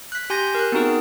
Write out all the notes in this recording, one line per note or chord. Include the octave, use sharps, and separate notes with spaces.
F#6 B6
G4 G#5 C6 G6 A#6
A#4 F#6
B3 C4 D#4 F#4 G#4 A#4